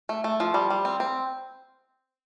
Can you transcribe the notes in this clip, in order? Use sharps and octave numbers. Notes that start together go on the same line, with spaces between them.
A3
A3
F3
G3
G3
C4
C4